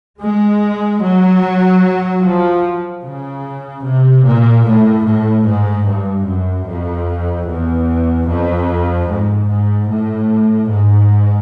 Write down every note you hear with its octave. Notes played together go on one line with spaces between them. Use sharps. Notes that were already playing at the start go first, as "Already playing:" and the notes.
G#3
F#3
F3
C#3
C3
A#2
A2
A2
G#2
G2
F#2
F2
E2
F2
G#2
G#2
A2
G#2